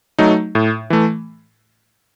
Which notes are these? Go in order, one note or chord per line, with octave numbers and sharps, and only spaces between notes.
F#3 A3 D#4
A2
E3 A3